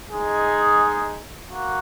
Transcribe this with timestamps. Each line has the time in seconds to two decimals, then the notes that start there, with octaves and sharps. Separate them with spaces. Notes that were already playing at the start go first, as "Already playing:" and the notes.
0.11 G#3 D#4 G#4
1.49 A#3 F#4